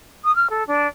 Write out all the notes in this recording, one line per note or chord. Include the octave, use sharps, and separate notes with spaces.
D#6
F6
A4
D4